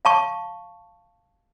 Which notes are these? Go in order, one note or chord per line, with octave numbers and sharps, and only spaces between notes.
F5 A5 C#6